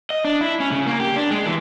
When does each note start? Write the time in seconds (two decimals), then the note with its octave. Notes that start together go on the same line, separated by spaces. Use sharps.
0.10 D#5
0.25 D4
0.41 E4
0.60 C#4
0.71 C#3
0.86 A#3
1.00 G4
1.16 D4
1.31 G#3
1.47 E3